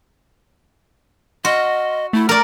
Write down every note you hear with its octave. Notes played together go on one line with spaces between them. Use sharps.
F#4 D#5 C6 F6
A3 E4
A#4 D5 F6